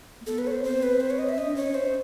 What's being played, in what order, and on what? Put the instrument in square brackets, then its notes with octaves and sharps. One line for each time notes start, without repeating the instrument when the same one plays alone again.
[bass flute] A#3
[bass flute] B3 [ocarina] A4
[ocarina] B4
C#5
C5
[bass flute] C4 [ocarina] C5
[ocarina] B4
C5
C#5
D#5
E5
[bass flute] C#4 [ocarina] D#5
[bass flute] D4
[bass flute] C#4 [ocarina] C#5
[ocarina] C5